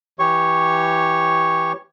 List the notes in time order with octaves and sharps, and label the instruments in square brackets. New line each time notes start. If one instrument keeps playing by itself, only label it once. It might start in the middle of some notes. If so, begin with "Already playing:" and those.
[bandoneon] E3 G4 C#5 C#6